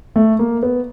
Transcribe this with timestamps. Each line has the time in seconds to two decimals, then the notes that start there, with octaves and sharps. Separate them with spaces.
0.16 A3
0.39 A#3
0.63 B3